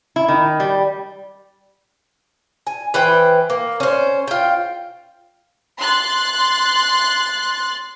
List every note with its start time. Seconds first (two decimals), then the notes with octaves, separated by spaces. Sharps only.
0.16 E4
0.28 D#3
0.60 G3
2.67 G#5
2.94 E3 B4 C5 G5
3.50 A#3
3.80 C#4 C5
4.28 F4 G5
5.79 C6 F#6 A6